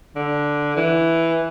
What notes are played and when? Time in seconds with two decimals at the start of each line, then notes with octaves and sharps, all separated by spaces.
0.16 D3
0.76 E3